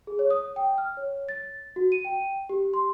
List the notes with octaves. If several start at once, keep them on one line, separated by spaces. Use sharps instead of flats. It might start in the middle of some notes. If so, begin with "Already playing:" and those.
G#4
C#5
D#6
G5
F6
C#5
A6
F#4
D#7
G5
G4
C6